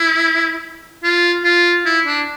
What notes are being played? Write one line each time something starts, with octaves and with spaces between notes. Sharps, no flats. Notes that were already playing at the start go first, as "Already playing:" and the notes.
Already playing: E4
F4
F4
E4
D4